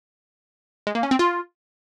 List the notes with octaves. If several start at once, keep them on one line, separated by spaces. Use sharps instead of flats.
G#3
A#3
C#4
C4
F4